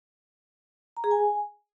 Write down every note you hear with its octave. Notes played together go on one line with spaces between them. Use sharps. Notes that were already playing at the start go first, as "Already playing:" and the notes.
A#5
G#4
G#5